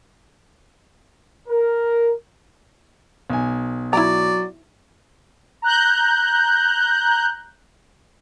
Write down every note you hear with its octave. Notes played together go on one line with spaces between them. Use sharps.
A#4
B1 G#5
F#3 E4 D5 A#5
A#5 F#6 G6